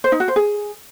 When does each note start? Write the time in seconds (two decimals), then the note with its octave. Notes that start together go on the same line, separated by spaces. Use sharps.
0.04 C5
0.12 D#4
0.20 F#4
0.28 C5
0.36 G#4